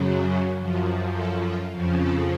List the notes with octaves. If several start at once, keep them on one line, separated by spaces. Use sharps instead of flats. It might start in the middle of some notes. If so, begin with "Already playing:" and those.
Already playing: F#2 C#3 F#3
F#2 F3
A4
F4
F2 C#3 F3
A4